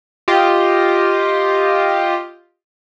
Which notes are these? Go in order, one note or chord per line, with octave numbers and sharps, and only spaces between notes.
F4 G4 D#5